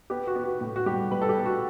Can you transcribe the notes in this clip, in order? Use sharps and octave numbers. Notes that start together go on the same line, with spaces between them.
B3 G4
F#4
B3
F#4
A2
F#4
G3 G4
G3 B4
A4
G4
B3
F#4